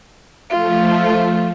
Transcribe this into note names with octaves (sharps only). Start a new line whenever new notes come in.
F3 A3 F4